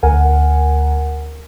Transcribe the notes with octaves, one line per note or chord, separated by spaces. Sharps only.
D2 A#4 F#5 G#5